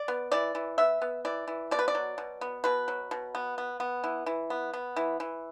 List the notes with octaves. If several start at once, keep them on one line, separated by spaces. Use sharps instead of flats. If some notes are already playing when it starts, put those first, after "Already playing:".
Already playing: D5
B3
E3 D5
E3
B3 E5
B3
E3 D5
E3
B2 D5
B4
D5
F#3
B2
B3
B2 B4
F#3
B2
B3
B3
B3
E3
E3
B3
B3
E3
E3